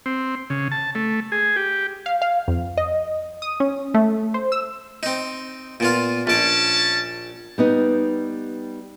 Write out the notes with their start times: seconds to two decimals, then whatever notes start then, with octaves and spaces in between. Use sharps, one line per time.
0.06 C4
0.50 C#3
0.72 A5
0.95 A3
1.32 G#4
1.56 G4
2.06 F5
2.22 F5
2.48 F2
2.77 D#5
3.42 D#6
3.60 C#4
3.94 A3
4.34 C5
4.52 E6
5.03 C4 D#4
5.80 A#2 B3 F4
6.27 A#1 C#4 D5 A5
7.58 G3 B3 D#4